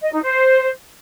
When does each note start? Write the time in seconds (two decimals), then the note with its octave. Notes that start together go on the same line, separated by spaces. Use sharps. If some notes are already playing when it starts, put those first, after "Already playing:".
0.02 D#5
0.12 D#4
0.22 C5